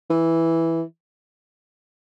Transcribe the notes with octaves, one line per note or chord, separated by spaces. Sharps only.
E3